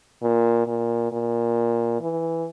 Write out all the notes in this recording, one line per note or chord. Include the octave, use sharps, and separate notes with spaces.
A#2
A#2
A#2
E3